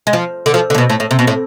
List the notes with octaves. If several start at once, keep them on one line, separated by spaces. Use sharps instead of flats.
G#3
F3
D3
F3
D3
A2
B2
A2
A2
C3
B2
A2